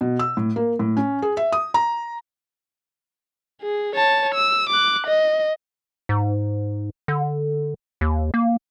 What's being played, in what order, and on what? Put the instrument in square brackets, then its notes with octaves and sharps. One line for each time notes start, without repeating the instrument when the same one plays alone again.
[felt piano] B2
E6
A2
A#3
A2
C#4
G#4
E5
D#6
A#5
[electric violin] G#4
C#5 A5
E6
D6 F#6
D#5
[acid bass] G#2
D3
D#2
A#3